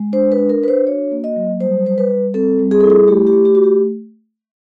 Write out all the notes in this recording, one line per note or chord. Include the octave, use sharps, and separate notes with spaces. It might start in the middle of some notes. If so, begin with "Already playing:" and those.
Already playing: G#3
D4 C5
B4
D4
A#4
D4 B4
C5
F#4 C#5
A#3
D#5
F#3
G3 C5
G3 C5
B4
G3
C4 A4
G3
G#4
E4 A4
G#4
A3 G4
G4
A3
G4
A3 F#4
G4